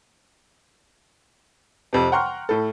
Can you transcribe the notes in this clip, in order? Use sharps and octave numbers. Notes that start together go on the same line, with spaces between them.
F2 C3
F#5 G5 A#5 C6 C#6 F6
A2 A4